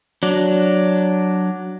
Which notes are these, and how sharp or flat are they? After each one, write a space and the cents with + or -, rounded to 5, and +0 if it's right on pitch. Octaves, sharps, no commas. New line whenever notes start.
F#3 +0 D4 +0